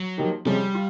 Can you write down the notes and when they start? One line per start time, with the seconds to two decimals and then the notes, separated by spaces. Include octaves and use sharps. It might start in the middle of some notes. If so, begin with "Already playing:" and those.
Already playing: F#3
0.18 F3 A#3 D#4 G4
0.45 C3 F3 G3 G#3 C#4
0.75 F4